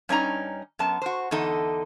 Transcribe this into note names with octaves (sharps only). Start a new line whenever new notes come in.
G2 C#4 D#4 A#5
F#2 B3 A5
F#4 C5
E2 D3 D#4 A4